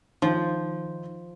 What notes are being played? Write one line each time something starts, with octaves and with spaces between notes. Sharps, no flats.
D#3 F3